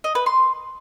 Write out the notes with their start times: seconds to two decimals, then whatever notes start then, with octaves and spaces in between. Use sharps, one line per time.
0.04 D#5
0.15 B4
0.26 C6